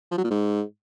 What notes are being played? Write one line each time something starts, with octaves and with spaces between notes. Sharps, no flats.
F3
F#3
A#2
G#2